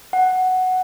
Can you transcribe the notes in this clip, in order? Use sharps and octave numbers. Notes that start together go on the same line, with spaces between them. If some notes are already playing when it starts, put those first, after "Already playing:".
F#5